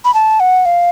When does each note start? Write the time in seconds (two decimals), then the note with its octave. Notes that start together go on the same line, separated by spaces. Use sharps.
0.05 B5
0.14 A5
0.40 F#5
0.66 F5